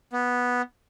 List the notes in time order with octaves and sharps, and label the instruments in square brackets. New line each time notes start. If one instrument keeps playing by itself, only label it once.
[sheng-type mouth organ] B3